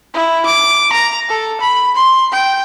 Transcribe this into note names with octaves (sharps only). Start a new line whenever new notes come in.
E4
D6
A#5
A4
B5
C6
G5